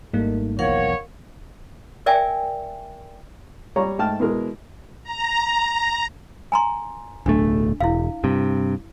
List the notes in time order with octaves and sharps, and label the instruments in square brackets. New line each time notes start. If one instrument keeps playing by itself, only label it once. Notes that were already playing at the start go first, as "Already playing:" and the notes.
[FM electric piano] G#1 A#3 D#4 [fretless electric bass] G#2 G3 A3
[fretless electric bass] B1 E2 F3 [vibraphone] A#4 F5 F#5 [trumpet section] C#5
[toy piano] A#4 D5 E5 G5 G#5
[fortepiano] G3 C#5 A#5 C#6
G#2 A3 G5 A5 F6
B2 E3 G#3 A#4
[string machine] A#5
[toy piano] G#5 A#5 C6
[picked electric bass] D1 B1 A3 [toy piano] D4
[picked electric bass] E1 [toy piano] E4 F5
[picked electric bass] G2 C3